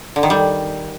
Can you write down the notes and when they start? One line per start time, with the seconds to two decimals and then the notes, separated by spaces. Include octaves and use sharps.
0.16 D3
0.23 D#3
0.30 G3